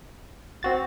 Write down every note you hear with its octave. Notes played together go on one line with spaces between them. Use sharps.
A1 C4 F#4 A6